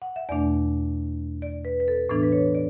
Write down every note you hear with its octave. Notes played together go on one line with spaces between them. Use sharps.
F#5
E5
E2 B2 A3 D4 D5
D5
B4
B4
A4
A2 E3 B3 D4 A4
B4
C#5
D5